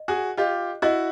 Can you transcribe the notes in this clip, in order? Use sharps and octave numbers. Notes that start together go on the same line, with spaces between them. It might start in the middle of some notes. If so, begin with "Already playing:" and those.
Already playing: D#5
F#4 G#4
F4 G4 D#5
E4 F#4 D#5